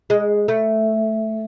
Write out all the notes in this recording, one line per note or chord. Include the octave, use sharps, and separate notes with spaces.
G#3
A3